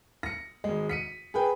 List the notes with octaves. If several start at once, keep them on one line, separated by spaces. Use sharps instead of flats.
A#6 C#7
G#1 G#3
B6 C#7 D#7
G#4 A#4 B4 G5